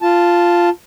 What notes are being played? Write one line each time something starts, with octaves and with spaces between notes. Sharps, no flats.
F4 A5